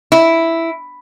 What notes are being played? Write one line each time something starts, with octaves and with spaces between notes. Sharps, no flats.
E4